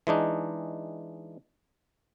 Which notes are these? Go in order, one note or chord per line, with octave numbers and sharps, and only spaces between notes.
E3 G#3 D4 D#4